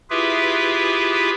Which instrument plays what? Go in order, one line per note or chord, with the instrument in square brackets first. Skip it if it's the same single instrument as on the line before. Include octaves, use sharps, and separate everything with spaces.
[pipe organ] E4 F4 G4 G#4 B4 E5